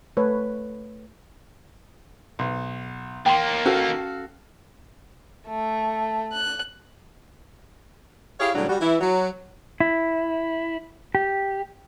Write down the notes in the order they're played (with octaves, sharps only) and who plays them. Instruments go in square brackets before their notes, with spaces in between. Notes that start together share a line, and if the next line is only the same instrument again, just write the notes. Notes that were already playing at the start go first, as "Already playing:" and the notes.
[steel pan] A3 B4 C#5
[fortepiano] B1
[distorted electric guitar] D#3 A#3 [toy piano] G5 C6
[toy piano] C#4 [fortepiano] F#4 A4 F5
[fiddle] A3
F#6
[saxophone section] E4 G4 G#4 C#5 F5
D2 A2 C#3 F#3 G3 D4
G3 F#4
E3 E4
F#3
[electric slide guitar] E4
G4